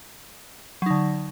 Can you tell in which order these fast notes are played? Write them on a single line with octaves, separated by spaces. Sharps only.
F#3 D#4 D3